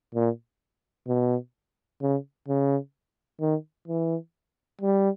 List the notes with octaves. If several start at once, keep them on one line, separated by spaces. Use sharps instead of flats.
A#2
B2
C#3
C#3
D#3
E3
G3